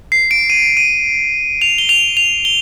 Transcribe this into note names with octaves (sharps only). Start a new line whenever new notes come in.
C7
D7
D#7
D#7
F7
G7
F7
F7
G7